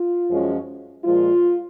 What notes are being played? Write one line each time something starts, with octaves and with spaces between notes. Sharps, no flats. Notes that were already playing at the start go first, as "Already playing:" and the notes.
Already playing: F4
F#2 F3 G#3 C#4
A#2 F3 G#3 F4